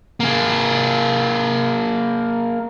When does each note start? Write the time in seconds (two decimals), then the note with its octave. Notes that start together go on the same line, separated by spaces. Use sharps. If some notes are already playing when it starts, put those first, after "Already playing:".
0.20 A#3 G#4